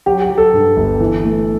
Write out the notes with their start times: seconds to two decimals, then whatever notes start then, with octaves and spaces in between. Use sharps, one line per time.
0.06 F#3 G4
0.22 G4
0.30 F#3
0.38 A4
0.53 G2
0.77 G1
1.01 E3
1.24 A3